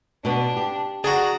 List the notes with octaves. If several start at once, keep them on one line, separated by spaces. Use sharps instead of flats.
B2 B3 D4
G4
D4 F#4 G#4 A#5